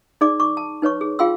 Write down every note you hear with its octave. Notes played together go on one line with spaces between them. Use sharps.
D#4 G#4 D5 D6
C#6 D6
A5
D#4 B4 C#5 C#6
G#4
F4 G#4 F5 G5 C6 E6